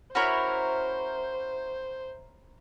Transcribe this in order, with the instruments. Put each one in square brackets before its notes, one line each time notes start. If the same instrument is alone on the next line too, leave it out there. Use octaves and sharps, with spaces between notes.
[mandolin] C#4 E4 A#4 [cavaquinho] F#4 C#5 [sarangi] C5